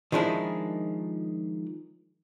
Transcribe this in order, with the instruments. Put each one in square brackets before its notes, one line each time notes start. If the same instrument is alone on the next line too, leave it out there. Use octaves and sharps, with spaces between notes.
[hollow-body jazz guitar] D#3 F3 G#3 D4 E4